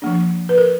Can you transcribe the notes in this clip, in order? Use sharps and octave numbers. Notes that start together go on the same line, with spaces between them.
F3 A#3 D4
B4
A#4